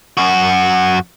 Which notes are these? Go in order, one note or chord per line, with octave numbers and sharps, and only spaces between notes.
F#2 F#4